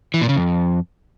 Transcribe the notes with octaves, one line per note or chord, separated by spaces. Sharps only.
E3
A#2
C#3
F2